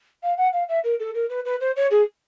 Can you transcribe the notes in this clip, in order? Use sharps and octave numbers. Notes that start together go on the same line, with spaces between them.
F5
F#5
F5
E5
A#4
A4
A#4
B4
B4
C5
C#5
G#4